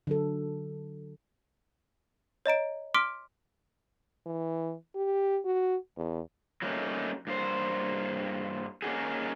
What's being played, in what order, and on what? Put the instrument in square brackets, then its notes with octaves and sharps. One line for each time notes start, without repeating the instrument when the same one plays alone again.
[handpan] D3 F#3 A4
[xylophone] C#5 D#5 A#5 D7
C6 D6 F6 B6 D7
[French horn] E3
G4
F#4
E2
[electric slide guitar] F#3 G3 A3 A#3 C#4 D#4
G2 A#3 C5
A#3 C#4 D#4 F#4 G#4